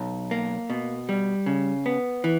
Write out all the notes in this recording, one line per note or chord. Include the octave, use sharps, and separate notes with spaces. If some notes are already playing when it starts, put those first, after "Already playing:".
Already playing: B1
A#3
B2
G3
C#3
B3
E3